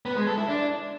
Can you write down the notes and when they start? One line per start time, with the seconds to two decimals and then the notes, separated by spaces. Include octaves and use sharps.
0.06 B3
0.16 G#3
0.27 A4
0.38 E4
0.49 D4